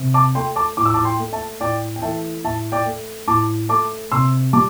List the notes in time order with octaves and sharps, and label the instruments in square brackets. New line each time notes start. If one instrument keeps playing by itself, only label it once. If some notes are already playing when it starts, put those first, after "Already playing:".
Already playing: [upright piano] C3
A5 D6
A3 G5 C6
A5 D6
A2 D6
E6
A5 D6
G5 C6
A3
E5 A5
A2 D5 G5
G5
E3 A3 E5 A5
A2 E5 A5
D5 G5
A3
A2 A5 D6
A3 A5 D6
C3 C6 E6
G3 A5 D6